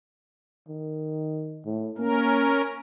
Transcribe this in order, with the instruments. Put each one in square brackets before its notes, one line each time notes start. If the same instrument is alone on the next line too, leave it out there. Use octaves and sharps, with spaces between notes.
[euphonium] D#3
A2
[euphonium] A#3 [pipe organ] C#4 A#4